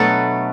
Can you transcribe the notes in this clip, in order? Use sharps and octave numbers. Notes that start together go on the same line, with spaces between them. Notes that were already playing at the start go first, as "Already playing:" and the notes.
Already playing: B2 F#3 A3 B3 D4 A4 B4